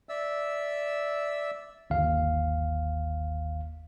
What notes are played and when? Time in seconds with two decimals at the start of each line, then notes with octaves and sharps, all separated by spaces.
0.09 D5 E5 E6
1.90 G1 D#2 F5